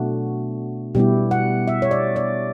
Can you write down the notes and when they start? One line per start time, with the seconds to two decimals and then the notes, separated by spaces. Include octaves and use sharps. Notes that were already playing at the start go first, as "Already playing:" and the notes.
Already playing: B2 A3 D4 F#4
0.95 B2 G3 B3 E4 G4
1.31 F#5
1.68 E5
1.82 C#5
1.91 D5
2.16 D5